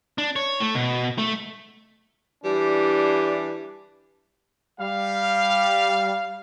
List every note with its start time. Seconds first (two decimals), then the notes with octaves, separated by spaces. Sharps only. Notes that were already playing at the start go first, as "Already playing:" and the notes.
0.18 D4
0.36 C#5
0.60 A3
0.75 B2
1.18 A3
2.43 E3 G3 D4
4.81 G3 F5